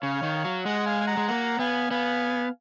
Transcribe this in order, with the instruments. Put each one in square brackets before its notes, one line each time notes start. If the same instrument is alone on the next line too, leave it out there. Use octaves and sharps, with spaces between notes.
[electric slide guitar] C#3 [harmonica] C#5 F5
[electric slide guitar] D#3
F#3
[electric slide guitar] G#3 [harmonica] D#5 F#5
[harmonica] F5 G#5
G#5
F#5 A#5
[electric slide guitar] G#3
[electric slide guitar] A#3 [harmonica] F#5 A#5
[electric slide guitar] B3 [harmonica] F5 G#5
[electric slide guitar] B3 [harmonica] F5 G#5